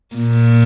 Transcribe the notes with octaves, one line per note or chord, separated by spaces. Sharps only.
A#2